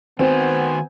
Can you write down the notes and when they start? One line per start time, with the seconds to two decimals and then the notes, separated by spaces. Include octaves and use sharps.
0.19 D#3 B3 C4 F#4 C5 G#5